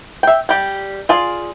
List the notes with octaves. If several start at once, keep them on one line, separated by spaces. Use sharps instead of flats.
E5 G5
G3 G4
F4 G#4 D5